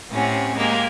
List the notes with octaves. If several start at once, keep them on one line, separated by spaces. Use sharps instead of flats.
A2 C3 C#4 F#5
G#3 A#3 G4